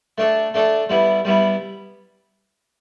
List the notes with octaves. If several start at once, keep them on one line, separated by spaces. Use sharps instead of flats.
A3 D4 A4
A3 D4 A4
G3 B3 E4
G3 B3 E4